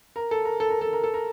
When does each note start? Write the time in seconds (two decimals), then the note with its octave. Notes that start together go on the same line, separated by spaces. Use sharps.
0.16 A#4
0.31 A4
0.45 A#4
0.60 A4
0.71 A#4
0.81 A4
0.93 A#4
1.04 A4
1.14 A#4